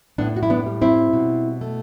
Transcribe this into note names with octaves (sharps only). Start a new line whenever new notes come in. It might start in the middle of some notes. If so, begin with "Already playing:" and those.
A2 B3 D4
F#4
E4
B3 D4
G3
C4 E4
B2
A3